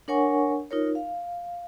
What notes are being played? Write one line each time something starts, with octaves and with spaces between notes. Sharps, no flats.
D4 A#4 C#5 F#5 G#5 C#6
D#4 F4 A#4 C#5
F5